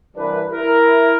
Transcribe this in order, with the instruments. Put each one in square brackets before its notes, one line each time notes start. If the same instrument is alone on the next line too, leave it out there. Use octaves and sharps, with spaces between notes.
[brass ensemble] C2 G2 E3 D4 A#4 B4
E4 A#4